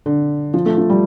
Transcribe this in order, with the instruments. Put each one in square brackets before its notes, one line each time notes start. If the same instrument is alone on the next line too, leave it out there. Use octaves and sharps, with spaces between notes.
[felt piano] D3
F3
A3
F3
G3